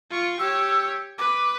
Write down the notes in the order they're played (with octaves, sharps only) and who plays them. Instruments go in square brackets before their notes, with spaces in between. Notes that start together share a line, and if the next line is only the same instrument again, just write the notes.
[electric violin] F4 C#6
[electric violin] G4 C#5 [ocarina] E6
[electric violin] B4 [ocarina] D6